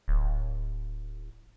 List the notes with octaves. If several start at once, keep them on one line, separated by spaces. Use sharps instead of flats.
D1